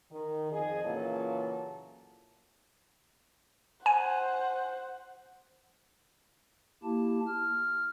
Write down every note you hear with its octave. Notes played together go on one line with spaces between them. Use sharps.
D#3
F2 G#4 D#5
A#2 C#3 E3 F#3 F4 A4
C5 F#5 G#5
A#3 E4 G4 A5
F6